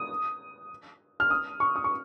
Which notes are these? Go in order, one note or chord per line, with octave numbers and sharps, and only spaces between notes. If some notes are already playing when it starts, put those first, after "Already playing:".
Already playing: D#6
F6
D#6
C#6
D#6
C#6